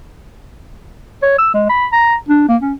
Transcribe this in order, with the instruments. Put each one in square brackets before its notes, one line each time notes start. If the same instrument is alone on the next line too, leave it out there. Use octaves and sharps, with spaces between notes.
[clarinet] C#5
E6
G#3
B5
A#5
D4
A#3
C#4